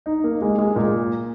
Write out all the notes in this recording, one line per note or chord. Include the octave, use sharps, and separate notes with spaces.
D#4
A#3
G#3
G#3
A#2